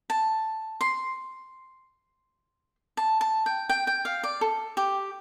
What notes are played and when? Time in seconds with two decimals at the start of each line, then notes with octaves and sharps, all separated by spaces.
0.10 A5
0.81 C6
2.97 A5
3.21 A5
3.46 G5
3.69 G5
3.87 G5
4.05 F5
4.24 D5
4.41 A4
4.77 G4